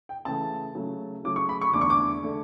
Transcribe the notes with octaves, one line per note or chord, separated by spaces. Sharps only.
G5
C#3 E3 A3 A5
C#3 F#3 A3
C#3 F#3 A3 D6
C#6
B5
C#6
E2 D3 A3 D6
C#6
D6
D3 A3